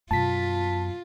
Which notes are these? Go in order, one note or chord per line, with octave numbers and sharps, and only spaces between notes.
F#2 B2 F4 A5 B6